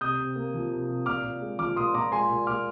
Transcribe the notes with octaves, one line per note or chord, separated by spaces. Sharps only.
C3 D#6 G6
C3
A#3
F3
C3
C3
A#2 D6 F6
A#2
G#3
F3 D6 F6
A#2 C6 D#6
A#2 A#5 D6
G#3 G#5 C6
A#2
A#2 D6 F6